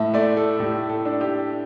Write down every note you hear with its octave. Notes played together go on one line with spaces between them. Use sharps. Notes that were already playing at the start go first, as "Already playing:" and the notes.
Already playing: A2 E5 A5
A3 D5
A4
A2 G4
A4
D4
G4